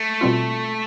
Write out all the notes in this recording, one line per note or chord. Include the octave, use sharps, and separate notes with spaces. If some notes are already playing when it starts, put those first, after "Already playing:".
Already playing: A3
B2 G3 C4 F4